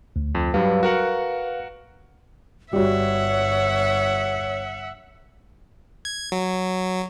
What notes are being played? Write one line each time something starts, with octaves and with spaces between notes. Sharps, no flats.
D2
F2
G2 F#3 G3 B4 F5
F#4 A#4 F#5
G1 G3 F#4 C#5 E5 F#5
G#6
F#3